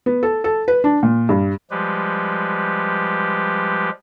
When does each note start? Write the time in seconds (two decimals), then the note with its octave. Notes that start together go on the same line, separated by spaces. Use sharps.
0.06 B3
0.23 A4
0.44 A4
0.68 B4
0.84 D4
1.03 A#2
1.29 G2
1.71 F3 G3 G#3 G4 B4